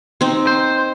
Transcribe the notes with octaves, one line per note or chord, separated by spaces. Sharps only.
C4 D#4
C5